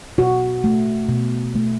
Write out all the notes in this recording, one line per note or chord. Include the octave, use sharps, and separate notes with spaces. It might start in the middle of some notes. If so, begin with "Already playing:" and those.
B2 F#4
A3
B2
A3